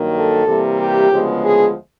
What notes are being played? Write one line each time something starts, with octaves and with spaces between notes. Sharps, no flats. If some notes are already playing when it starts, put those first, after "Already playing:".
Already playing: G2 D#3 F#3 A#3
A4
C3 E3 G3 A#3
G4
D2 C#3 F3 G#3 B3
G#4